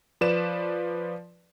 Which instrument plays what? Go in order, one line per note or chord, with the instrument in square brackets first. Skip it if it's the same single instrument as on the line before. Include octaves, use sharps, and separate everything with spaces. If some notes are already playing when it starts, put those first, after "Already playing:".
[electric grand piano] F3 B4 D5 E7